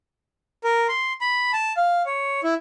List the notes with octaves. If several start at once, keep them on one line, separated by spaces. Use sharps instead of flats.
A#4
C6
B5
A5
F5
C#5
E4